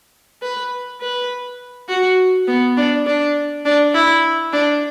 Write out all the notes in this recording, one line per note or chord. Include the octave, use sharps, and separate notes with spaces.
B4
B4
F#4
B3
D4
D4
D4
E4
D4